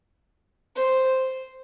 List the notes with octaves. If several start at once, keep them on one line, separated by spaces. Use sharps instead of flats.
C5